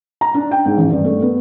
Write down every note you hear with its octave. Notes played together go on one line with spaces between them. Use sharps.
A#5
D4
G5
G#2
A1
G2
A3
B3